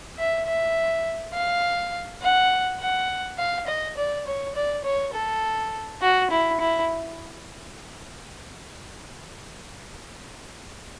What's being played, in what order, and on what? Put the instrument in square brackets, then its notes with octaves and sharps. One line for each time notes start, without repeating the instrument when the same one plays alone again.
[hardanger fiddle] E5
E5
F5
F#5
F#5
F5
D#5
D5
C#5
D5
C#5
A4
F#4
E4
E4